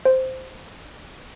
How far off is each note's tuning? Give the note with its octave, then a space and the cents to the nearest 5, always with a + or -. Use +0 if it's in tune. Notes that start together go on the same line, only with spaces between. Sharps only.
C5 -5